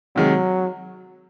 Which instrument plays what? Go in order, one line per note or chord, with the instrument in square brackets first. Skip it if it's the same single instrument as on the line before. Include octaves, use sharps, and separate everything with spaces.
[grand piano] C3 D#3 G#3 [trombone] F#3